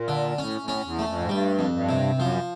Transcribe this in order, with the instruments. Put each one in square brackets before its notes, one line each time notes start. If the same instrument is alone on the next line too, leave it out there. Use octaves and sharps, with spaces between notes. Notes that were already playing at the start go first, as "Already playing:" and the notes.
Already playing: [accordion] A#2
[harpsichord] D3
[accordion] A2 [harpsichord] C#4
[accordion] A2
[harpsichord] C#4
[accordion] E2
[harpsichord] A3
[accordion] F2
G#2
[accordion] G2 [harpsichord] G3
[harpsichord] F2
[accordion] G2
[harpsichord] C3
[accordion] G2
[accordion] F#2 [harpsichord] F3